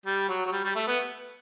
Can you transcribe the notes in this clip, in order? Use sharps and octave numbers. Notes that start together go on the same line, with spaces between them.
G3
F#3
F#3
G3
G3
A3
B3